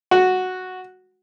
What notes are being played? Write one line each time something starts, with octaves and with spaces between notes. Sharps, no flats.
F#4